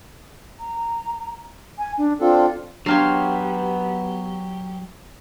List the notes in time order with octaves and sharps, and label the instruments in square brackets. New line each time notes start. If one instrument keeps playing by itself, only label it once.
[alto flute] A#5
G#5
D4
[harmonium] C4 D4 A4 [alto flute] F4
[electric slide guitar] F#3 G4 [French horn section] B3 [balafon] D4 [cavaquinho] C#5 F5 C6